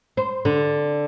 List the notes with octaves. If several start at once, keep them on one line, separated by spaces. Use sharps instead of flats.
C5
D3